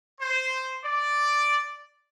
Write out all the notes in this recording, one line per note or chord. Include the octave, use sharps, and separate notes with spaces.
C5
D5